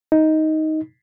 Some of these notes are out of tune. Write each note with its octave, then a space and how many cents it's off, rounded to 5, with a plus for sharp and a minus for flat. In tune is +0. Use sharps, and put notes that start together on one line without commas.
D#4 +10